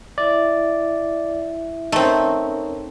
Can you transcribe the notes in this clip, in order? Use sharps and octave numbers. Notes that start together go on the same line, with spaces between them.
E4 D5 E5
A3 C4 C#4 D#4 A#4 C#5